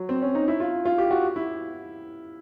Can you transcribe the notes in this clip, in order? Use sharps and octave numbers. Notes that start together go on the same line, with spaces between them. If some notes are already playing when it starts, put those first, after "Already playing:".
Already playing: F#3
C4
C#4
D#4
E4
F4
F4
G4
F#4
E4